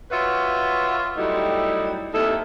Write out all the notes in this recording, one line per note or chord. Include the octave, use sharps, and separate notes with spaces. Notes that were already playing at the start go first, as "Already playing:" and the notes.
F4 F#4 B4 C#5 E5 F5
F#3 G3 A3 D#4 E4 G4
D#2 C3 D#4 E4 A4